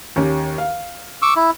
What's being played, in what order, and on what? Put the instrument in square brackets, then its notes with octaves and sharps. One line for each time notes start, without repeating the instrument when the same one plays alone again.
[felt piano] D#2 C#4 G4
F5
[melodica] C#6 D6 E6
E4